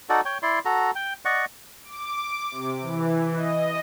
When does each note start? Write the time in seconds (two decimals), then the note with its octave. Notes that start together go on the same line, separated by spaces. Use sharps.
0.09 D#4 F#4 A4 D5
0.25 C#5 G5
0.43 E4 D5 C6
0.65 F#4 A4 A#5
0.95 G5
1.25 D5 D#5 F#5 C#6
1.84 D6
2.51 C3
2.81 E3
3.35 D#5